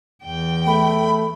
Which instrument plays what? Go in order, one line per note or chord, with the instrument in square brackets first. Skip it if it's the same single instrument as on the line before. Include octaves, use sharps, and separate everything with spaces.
[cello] E2 G5
[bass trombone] A3 [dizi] B5